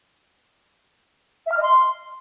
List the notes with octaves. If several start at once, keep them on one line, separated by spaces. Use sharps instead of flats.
E5
F6
D#5
C6